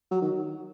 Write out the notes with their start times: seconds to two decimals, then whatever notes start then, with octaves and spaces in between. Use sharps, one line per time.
0.11 F#3
0.21 D#3